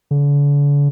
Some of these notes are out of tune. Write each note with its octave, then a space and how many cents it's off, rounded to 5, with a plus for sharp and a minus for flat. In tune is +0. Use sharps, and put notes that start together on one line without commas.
D3 -40